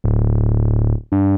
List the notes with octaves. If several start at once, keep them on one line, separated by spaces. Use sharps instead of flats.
D1
G2